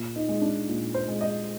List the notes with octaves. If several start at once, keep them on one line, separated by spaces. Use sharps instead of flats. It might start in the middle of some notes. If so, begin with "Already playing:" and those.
Already playing: A#2
D#4
G#3
D4
A#2
C5
G#3
D#5